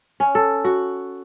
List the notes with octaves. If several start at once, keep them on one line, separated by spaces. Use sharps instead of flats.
C#4
A4
F#4